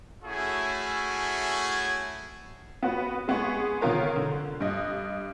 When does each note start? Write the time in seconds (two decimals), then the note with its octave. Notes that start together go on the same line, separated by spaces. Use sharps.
0.23 A3 C#4 E4 F#4 G#4
2.83 B3 F#4 B4
3.28 G#3 B3 G#4 C#6
3.81 D3 D#3 B3 F4 A#4 C#5
4.16 D3
4.60 G2 D#5